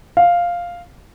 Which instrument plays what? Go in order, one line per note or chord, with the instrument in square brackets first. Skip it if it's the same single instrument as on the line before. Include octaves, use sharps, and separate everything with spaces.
[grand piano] F5